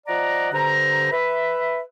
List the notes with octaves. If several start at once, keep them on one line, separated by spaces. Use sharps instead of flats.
F3 D5 D#5 F#5 A#5
G2 D3 C5 A#5
B4 E5